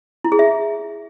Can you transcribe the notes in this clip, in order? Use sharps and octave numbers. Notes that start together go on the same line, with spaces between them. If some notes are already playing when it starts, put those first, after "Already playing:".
E4
G#4
E5